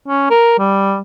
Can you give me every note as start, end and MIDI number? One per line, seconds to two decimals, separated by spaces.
0.08 0.27 61
0.30 0.56 70
0.59 0.98 55